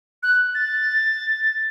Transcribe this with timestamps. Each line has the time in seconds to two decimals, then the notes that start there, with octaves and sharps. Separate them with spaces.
0.23 F#6
0.55 A6